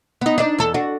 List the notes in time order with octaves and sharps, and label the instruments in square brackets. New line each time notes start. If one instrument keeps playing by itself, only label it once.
[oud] B3 D#4
D4 D#4 D5
E2 A4
D4 F#4